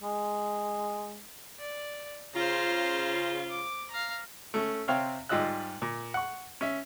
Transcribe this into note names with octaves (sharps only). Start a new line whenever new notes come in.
G#3
D5
C#3 F4 C5 A#5
D6
F5 A#5
A3 C#4
C3 C4 C#5 F5 G5 F6
G#2 G3 F4 D#5 E6 F#6
A#2
F#5 C#6
C#4 E5